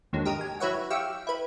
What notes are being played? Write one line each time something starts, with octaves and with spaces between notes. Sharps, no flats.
D#2 G#2 D3 F#3
G4 A#4 D#5 D#7
G#5
F#3 E4 B4 C#5 E5 F#5
G4 E5 F5 G5 C#6 E6
E4 B4